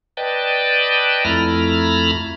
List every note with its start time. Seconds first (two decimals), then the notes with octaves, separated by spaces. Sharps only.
0.17 B4 D5 D#5 G5 A5
1.25 F2 A3 E4 A#5 B5 F6